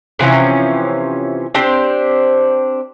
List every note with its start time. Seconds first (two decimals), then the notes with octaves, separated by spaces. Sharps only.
0.19 C3 E3 F3 C#4
1.54 C4 D4 G4 C5